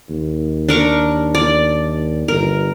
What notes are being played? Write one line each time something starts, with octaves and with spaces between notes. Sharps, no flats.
D#2
D4 A#4 C#6
D5
G1 A#4